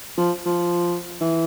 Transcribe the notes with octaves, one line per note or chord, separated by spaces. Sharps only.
F3
F3
E3